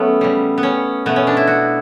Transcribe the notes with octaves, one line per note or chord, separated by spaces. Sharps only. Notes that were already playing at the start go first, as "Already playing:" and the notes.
Already playing: F#3 A3 B3 C#4
C#3 G3
B3
C#4
B2 A3 B3
C#4
D4
E4
F#4